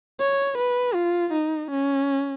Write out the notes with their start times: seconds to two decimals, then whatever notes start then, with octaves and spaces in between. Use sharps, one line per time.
0.19 C#5
0.58 B4
0.95 F4
1.33 D#4
1.71 C#4